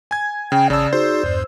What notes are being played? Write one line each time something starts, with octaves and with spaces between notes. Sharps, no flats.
G#5 G#6
C#3 G5
A1 C#3 D5 A5 D#6 E6
D#4 F#4 G#4 C5
E2 G2